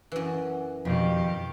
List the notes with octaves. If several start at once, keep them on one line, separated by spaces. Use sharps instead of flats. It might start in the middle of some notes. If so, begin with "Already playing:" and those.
F#2 E3
F2 B2 D#3 G4